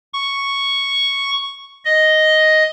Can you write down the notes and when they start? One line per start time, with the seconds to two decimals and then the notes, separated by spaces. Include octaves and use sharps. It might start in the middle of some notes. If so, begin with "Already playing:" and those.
0.14 C#6
1.85 D#5